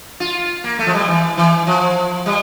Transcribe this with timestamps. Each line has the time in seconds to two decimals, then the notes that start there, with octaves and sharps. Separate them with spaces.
0.20 F4
0.64 A#3
0.79 A3
0.87 F3
0.93 G3
1.08 E3
1.37 E3
1.67 F3
2.26 G3